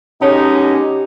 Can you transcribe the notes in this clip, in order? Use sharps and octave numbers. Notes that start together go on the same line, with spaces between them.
B2 G#3 C#4 D#4 G4 A4 C#5 A5